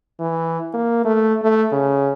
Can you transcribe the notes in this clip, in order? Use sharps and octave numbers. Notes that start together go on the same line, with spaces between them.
E3
A#3
A3
A3
C#3